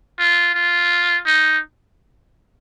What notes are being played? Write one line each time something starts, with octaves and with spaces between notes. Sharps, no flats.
F4
F4
D#4